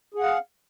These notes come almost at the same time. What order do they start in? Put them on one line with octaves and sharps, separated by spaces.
G#4 F#5 F5